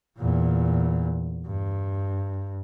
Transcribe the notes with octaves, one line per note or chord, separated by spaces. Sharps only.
E2 A#2
G2